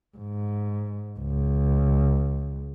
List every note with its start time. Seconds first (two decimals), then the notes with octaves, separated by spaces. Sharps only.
0.17 G#2
1.18 C#2